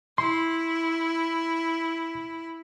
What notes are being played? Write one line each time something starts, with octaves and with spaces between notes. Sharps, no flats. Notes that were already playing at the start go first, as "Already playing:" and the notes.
E4 C6